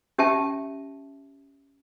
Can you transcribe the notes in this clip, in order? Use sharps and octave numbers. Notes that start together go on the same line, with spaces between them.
C#4 G4 E5 G5 A5